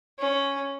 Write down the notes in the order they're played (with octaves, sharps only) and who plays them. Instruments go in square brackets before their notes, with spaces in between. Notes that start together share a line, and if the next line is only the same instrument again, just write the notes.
[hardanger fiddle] C#4